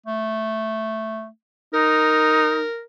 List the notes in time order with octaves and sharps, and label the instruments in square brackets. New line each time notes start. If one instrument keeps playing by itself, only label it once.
[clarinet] A3
[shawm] D#4 [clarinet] A#4